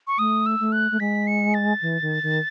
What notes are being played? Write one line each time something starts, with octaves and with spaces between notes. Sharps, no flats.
C#6
A3 D#6
E6
A3
F#6
A3
G#3 B6
C#7
A6
E3
D#3
D#3